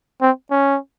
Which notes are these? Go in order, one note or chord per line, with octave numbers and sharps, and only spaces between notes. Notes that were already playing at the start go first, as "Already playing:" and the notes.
C4
C#4